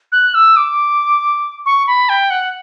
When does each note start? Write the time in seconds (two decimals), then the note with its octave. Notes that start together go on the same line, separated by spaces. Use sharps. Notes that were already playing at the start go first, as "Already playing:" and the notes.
0.12 F#6
0.35 E6
0.57 D6
1.66 C#6
1.87 B5
2.09 G5
2.30 F#5